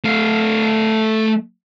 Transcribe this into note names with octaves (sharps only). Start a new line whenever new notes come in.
A3 F5